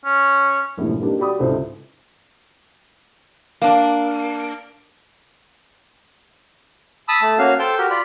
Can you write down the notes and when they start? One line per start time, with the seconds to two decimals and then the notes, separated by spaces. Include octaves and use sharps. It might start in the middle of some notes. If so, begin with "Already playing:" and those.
0.05 C#4
0.77 A#1 F#2 A2 C3 G#3
1.01 G3 A#3 C4 D4 D#4 G4
1.19 F#4 G4 D5 B5 D6 D#6
1.39 C#2 G#2 C3 E4 A4 C5
3.62 A#3 D4 F5
7.08 A5 B5 D#6 E6
7.22 A3 A5
7.39 A#3 C#4 F#4 F5
7.59 A4 C5 G5 A5 G6
7.78 F#4 G4 A#4
7.90 F4 D5 B5